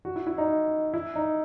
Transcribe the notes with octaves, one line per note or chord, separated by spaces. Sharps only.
F#4
E4
E4
D#4
E4
D#4